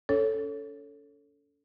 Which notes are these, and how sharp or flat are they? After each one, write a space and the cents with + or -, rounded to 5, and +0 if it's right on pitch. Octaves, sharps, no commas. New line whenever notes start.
C#4 +45 A4 +0 C#5 +0